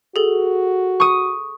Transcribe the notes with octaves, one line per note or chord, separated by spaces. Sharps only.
F#4 G#4 A4
C#6 D#6